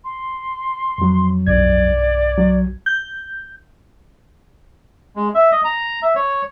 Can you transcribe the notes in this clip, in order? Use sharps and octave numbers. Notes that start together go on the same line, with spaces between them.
C6
F2 F#3
B1 G2 D5 G#6
F#3
G6
G#3
E5
D#5
A#5
E5
C#5